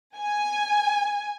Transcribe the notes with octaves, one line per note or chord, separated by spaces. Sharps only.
G#5